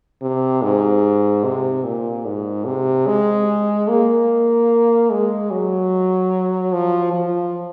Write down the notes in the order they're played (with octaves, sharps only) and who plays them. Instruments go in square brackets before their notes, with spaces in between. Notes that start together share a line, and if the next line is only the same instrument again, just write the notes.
[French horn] C3
G#2
C3
A#2
G#2
C3
G#3
A#3
G#3
F#3
F3
F3